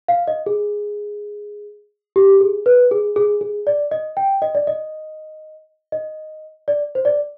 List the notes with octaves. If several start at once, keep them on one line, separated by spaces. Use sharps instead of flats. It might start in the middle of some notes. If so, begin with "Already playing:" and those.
F5
D#5
G#4
G4
G#4
B4
G#4
G#4
G#4
D5
D#5
G5
D#5
D5
D#5
D#5
D5
C5
D5